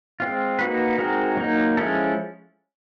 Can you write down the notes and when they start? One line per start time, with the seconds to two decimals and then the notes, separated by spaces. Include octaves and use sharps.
0.20 G#3 C4 F4
0.59 A#3 D#4 F#4 B4
0.98 G#3 C4 D#4 F#4 A#4
1.37 F#3 A#3 D#4
1.77 F3 G#3 C#4 E4 A4